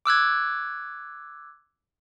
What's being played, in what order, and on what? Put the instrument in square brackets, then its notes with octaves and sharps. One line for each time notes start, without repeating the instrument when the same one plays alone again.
[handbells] D6 E6 F#6 G#6